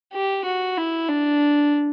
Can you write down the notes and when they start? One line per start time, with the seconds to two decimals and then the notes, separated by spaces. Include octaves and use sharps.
0.13 G4
0.45 F#4
0.77 E4
1.09 D4